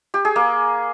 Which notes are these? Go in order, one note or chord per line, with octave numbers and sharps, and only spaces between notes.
G4
G#4
A#3